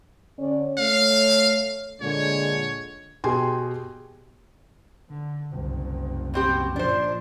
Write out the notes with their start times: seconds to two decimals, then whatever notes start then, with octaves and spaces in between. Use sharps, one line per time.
0.38 D3 C#4 D5
0.78 A3 C#5 F5
2.01 A#2 D3 G#3 C#5
3.24 B2 G4 G#4 G5 G#5 C6
5.09 D3
5.51 F#1 C2
6.34 B2 C4 G4
6.76 A#2 F3 D4 C5